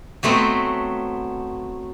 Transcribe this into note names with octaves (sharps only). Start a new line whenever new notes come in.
F#3 A3 B3 C4